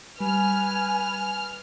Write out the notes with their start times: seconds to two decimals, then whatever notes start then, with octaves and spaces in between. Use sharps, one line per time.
0.20 G3 B4 G#5 F6